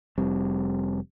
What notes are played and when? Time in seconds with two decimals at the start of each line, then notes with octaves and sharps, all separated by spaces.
0.18 F1 G3 C4